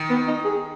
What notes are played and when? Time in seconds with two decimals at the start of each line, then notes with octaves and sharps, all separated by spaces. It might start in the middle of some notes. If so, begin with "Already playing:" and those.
Already playing: D#3
0.10 B3
0.28 D#4
0.44 G#4